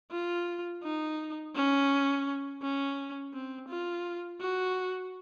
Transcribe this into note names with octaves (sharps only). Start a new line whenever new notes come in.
F4
D#4
C#4
C#4
C4
F4
F#4